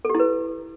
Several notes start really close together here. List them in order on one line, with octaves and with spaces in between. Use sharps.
A4 G4 E4 B4